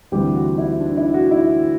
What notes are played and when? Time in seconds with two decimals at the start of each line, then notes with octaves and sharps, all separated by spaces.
0.12 D2 C3 E3 G3 G4
0.34 F#4
0.58 E4
0.80 D4
0.97 E4
1.14 F#4
1.31 E4